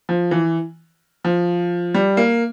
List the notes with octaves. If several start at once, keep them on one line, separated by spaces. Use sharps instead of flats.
F3
E3
F3
G3
A#3